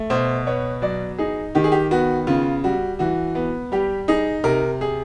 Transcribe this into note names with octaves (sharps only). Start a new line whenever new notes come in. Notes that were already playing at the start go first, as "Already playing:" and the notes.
Already playing: A3
B2 C5
B3 C#5
F#3 D5
D#4 G#4
D#3 G4
G#4
G4
B3 F#4
C#3 F4
G3 F#4
E3 F#4
B3
G3 G4
D#4 G#4
C3 A#4
G#4